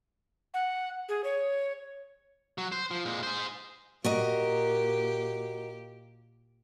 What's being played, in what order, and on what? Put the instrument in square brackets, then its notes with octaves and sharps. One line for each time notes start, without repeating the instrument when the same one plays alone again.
[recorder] F#5
G#4
C#5
[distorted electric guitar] F#3
C5
F3
A#2 G#3
G#4 C5
[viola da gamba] A#2 G4 [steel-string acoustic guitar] F#4 A#4 D#5